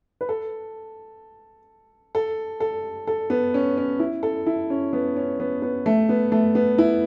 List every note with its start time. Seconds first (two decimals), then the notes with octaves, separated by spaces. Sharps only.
0.21 B4
0.29 A4
2.15 A4
2.60 A4
3.07 A4
3.30 B3
3.54 C#4
3.77 C#4
3.99 E4
4.23 A4
4.46 E4
4.70 C#4
4.93 B3
5.17 C#4
5.40 B3
5.62 B3
5.86 A3
6.09 B3
6.32 A3
6.55 B3
6.78 E4